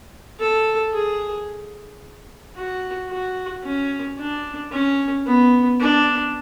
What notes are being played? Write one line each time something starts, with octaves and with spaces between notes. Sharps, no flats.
A4
G#4
F#4
F#4
C#4
D4
C#4
B3
D4